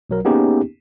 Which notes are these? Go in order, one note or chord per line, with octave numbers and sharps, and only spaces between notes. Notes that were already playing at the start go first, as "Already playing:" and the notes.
B1 F#3 A#4
A#3 B3 C#4 D#4 G4 G#4